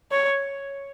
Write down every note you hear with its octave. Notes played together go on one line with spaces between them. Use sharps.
C#5